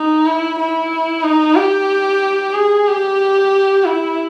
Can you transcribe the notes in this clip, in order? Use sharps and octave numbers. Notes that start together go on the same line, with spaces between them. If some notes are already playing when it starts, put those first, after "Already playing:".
Already playing: D#4
E4
E4
D#4
G4
G#4
G4
E4